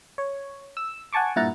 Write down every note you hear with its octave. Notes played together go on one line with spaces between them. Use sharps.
C#5
E6
F#5 G#5 A5 C#6 D6
G2 A#2 E4 F#5 A#5 A6